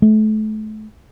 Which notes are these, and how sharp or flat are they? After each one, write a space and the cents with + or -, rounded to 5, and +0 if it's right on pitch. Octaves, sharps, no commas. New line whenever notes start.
A3 -30